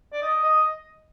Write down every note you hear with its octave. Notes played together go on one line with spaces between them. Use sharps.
D5
D#5
D#5